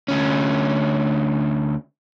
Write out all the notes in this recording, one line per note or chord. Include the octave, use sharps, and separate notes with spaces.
D2 C#4